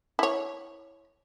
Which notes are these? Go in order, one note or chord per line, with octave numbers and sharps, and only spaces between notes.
E4 C#5